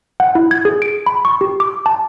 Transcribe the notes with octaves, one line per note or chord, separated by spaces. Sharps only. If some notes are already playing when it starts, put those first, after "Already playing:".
F#5
E4
G#6
G#4
D7
B5
C#6
G4
D6
A5